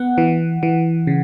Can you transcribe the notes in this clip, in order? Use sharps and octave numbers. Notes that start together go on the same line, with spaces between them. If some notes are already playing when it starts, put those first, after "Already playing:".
Already playing: B3 F#5
E3
E3
C#3